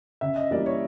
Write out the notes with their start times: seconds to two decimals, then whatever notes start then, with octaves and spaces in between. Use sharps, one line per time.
0.21 C#3 E5
0.36 D#5
0.51 E3 G3 A#3 D5
0.66 C#5